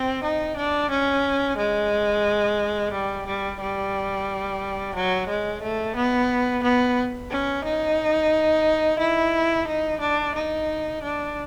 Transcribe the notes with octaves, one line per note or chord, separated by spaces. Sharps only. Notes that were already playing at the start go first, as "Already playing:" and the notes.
Already playing: C4
D#4
D4
C#4
G#3
G3
G3
G3
F#3
G#3
A3
B3
B3
C#4
D#4
E4
D#4
D4
D#4
D4